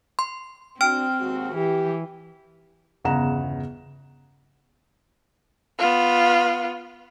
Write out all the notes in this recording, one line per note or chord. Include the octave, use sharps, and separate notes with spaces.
C6
C4 D4 F#4 G5 F6
D#2 G#3 F#4
E3 G4
G1 E2 C#3 F#5 A#5 E7
B3 F4